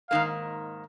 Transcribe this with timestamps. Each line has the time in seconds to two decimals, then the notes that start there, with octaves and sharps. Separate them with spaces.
0.10 G#2 D#3 A#3 F5